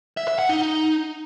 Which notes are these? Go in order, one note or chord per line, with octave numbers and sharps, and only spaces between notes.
E5
E5
F#5
D#4